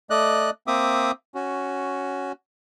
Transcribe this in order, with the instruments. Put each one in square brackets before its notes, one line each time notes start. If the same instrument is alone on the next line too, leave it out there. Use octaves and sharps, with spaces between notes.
[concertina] A3 D5 D#5 F#6
A#3 C4 E5 D6 D#6
C#4 F#4